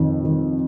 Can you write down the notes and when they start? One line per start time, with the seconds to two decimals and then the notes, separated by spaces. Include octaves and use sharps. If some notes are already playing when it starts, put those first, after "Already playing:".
Already playing: F2 D#3
0.24 D#3